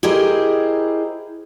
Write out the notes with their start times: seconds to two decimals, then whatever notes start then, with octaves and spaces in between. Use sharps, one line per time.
0.03 E4 G4 G#4 A#4 C5 D#5